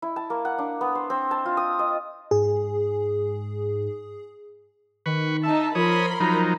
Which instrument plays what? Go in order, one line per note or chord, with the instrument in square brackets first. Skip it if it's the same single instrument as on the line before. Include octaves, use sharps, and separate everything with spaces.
[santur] E4
A5
A#3
F#5
D4
B3
C5
C4
A5
F4
D#6
D#5
[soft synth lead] G#2 [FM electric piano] G#4
[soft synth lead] D#3 [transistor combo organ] B4 B5 C#6
[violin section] D#4 A5 [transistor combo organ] E5
[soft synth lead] F3 [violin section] A#4 B5 C6 [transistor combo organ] C#5 D#6
[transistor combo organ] F3 F#3 D#4 [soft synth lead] A#5